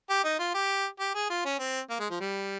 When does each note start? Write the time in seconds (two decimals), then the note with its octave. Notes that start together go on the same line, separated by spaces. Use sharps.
0.10 G4
0.24 D#4
0.39 F4
0.54 G4
1.00 G4
1.15 G#4
1.30 F4
1.45 C#4
1.59 C4
1.90 A#3
1.99 G#3
2.10 F3
2.20 G3